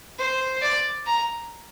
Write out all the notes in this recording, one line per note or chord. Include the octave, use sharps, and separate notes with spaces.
C5
D5
A#5